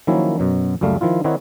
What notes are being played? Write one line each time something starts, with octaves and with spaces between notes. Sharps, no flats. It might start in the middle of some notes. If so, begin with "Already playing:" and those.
D#3 F3 F#3 A#3 C#4 E4
F#2 B2 F#3
C#2 F#2 G3 A3 F5
D#3 F3 E4 F4
D#3 C4 D#4 E4 C#5 F#5